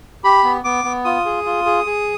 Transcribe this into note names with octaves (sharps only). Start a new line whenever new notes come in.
G4 B5
B3
B3 D6
B3
F4 D#6
G#4
F4
G#4
G#4